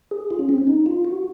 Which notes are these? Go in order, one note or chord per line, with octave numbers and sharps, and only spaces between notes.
G#4
F4
C#4
C4
C#4
D#4
F4
F#4